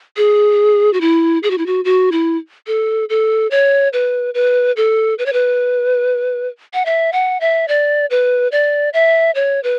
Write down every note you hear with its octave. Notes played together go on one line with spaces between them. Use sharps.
G#4
F#4
E4
G#4
F#4
E4
F#4
F#4
E4
A4
A4
C#5
B4
B4
A4
B4
C#5
B4
F#5
E5
F#5
E5
D5
B4
D5
E5
C#5
B4